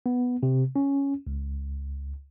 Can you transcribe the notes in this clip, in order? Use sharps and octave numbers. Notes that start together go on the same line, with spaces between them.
B3
C3
C#4
C#2